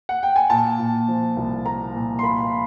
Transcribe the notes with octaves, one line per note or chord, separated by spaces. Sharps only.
F#5
G5
G#5
A#2 A5
A#2
F3
C2
A#3 A#5
A#2
C6
A#3 B5